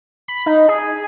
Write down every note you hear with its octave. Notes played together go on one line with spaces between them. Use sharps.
B5
D#4
G#4